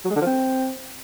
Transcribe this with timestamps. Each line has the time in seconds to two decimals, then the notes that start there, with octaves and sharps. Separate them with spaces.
0.05 F#3
0.10 G#3
0.16 D3
0.21 F3
0.27 C4